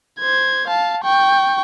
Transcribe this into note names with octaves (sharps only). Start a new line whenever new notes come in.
C5 G#6
F5 A5
G5 C#6